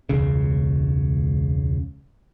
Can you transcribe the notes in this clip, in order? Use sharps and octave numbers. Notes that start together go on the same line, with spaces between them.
E1 C#2 C#3